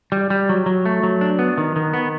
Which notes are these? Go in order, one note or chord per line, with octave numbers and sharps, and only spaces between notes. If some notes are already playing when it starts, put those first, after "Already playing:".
G3
G3
F#3
F#3
A3
F#3
D4
B3
D#3
D#3
B3